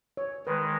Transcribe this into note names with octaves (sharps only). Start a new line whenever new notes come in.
C#5
D#3 G#3 B4